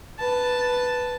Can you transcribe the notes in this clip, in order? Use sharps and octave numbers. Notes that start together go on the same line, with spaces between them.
B4 A5